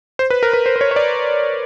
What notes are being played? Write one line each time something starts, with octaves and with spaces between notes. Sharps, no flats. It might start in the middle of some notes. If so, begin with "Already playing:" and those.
C5
B4
A#4
B4
C5
C5
C#5
C#5
D5